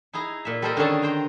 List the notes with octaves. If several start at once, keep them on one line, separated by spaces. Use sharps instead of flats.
D#4 E4 G#4 A#5
A#2 E5
G3 A4 A#4 C5 D#5
D3 D#3 C#4 G#4 A5
C5 G5 A#5